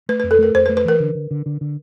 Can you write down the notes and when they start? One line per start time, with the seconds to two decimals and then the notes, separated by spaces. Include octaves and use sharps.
0.09 A3 B4
0.20 F2 B4
0.31 A4
0.39 A3 A#4
0.54 F2 C5
0.66 B4
0.69 A3
0.77 B4
0.85 E3 A#4
1.00 D3
1.15 D3
1.31 D3
1.46 D3
1.61 D3